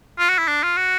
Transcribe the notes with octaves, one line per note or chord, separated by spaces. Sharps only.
F4
F#4
E4
D4
F4
F#4